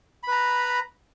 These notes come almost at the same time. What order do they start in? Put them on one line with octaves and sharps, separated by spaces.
B5 B4 A#5